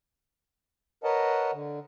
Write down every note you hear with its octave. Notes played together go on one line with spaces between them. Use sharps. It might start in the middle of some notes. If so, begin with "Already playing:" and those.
A#4 B4 C#5 D#5 F#5 A5
D3